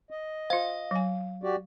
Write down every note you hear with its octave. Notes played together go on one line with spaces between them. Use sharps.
D#5
F4 C5 F5
F#3 G#5
F#4 G4 D5